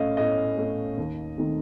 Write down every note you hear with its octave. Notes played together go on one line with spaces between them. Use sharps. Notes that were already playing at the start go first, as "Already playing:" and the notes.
Already playing: A2 A3 C#4 D#5 F5
A2 D#5
A3 C#4
D#2
D#3 A3 C4 D#4